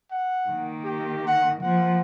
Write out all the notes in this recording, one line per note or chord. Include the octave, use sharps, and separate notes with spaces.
F#5
D#3 A#3
G4
F#5
F3 A#3 F#5